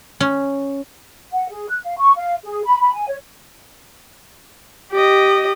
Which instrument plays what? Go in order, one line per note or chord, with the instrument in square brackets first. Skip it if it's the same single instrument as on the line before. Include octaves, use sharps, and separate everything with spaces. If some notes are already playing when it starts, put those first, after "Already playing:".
[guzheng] C#4
[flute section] F#5
G#4
F#6
F5
C#6
F5
G#4
B5
B5
G#5
C#5
[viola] G4 D#5